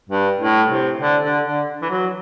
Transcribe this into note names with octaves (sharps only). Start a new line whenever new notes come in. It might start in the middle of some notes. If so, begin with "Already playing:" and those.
G2
A2
C3
D3
D3
D3
E3
F#3